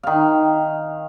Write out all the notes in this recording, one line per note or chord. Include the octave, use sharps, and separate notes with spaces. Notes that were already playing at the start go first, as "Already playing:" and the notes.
D#3 F5